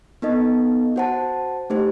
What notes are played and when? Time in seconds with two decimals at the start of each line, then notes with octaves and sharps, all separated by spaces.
0.22 B3 D#4 A4 D#5
0.96 F#4 C5 F#5 A5
1.70 A3 D#4 G4 C5